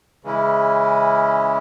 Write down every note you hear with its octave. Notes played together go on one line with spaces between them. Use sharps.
C#3 E3 G#3 C#4 E4